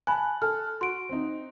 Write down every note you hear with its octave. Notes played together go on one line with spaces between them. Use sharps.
G#5 A5 B5 F#6
A4 F6
F#4 C6 D7
C4 D#4